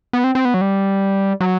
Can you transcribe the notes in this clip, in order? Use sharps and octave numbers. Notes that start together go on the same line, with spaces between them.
B3
C4
C4
B3
F#3
G3
F#3